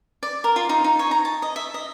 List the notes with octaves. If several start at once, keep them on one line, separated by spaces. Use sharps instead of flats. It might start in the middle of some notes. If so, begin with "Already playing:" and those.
D5
A#4
F4
D#4
D#4
C#5
A#5
A5
D#5
E5
D#5